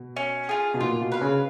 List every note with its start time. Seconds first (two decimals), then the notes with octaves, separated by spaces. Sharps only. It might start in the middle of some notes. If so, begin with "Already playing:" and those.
Already playing: B2
0.17 C#4
0.49 F4 G#4
0.74 B2
0.80 A#2 F4
1.01 B2
1.12 B4 F5
1.22 C#3